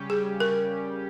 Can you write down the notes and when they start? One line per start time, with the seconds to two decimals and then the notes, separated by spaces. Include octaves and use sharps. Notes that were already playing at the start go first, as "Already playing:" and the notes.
Already playing: C#3 G3 C#4 G4
0.10 G#4
0.40 A#4